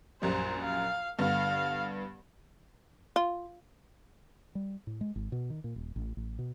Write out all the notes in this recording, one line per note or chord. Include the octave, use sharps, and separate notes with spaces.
A#1 F#2 G3 C5
F5
G2 D3 B3 F5
F4
G3
A2
G#3
G#1
B2
D#3
A#2
D#1
A1
A1
B2